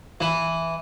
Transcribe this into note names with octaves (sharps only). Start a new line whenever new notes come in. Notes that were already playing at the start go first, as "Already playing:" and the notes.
E3